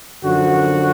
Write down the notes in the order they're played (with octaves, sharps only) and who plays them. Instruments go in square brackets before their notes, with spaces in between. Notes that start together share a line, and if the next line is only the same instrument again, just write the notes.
[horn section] F#2 D3 F3 F#4